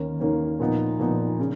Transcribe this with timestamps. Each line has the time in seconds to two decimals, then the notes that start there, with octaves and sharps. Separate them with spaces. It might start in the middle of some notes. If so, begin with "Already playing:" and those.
Already playing: D#2 D#3 A#3 C#4
0.20 D#2 D#3 A#3 C#4
0.60 A#2 F3 B3 D#4
1.00 A#2 F3 B3 D#4
1.40 C#3